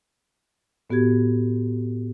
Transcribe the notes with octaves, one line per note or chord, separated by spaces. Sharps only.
A2 B3 F#4 G4 G#6